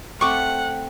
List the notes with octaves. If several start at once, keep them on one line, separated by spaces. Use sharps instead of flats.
A3 C4 F#5 C#6 D6